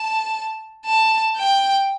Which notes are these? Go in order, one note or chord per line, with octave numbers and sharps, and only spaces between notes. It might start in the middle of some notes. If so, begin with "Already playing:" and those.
Already playing: A5
A5
G5